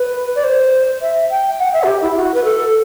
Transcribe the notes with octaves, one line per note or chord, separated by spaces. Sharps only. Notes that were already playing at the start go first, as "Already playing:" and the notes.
Already playing: B4
D5
C5
E5
G5
F#5
E5
F#4
G4
E4
F#4
B4
A4